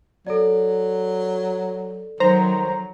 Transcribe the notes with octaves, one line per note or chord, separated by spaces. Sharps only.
F#3 A4 D5
D#3 F#3 C5 A#5